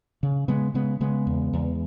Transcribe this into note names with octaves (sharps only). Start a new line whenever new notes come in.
C#3
C#3 G#3 B3
C#3 G#3 B3
C#3 G#3 B3
E2
E2